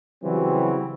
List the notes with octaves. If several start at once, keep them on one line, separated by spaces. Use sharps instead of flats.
C#3 E3 F#3 G3 C4 F#4